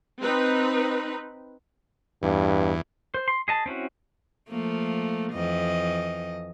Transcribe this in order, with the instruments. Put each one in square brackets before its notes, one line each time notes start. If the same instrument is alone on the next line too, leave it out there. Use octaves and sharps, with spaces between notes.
[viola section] C4 D#4 B4
[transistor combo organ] E2 [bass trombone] G2
[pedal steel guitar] C5
C6
G#4 D#5 A5
C4 C#4 E4 F#4
[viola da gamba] F3 A3 A#3
F2 E3 D#5